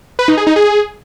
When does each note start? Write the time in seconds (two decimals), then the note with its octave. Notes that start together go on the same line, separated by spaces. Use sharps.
0.19 B4
0.28 D#4
0.37 G#4
0.47 D#4
0.56 G#4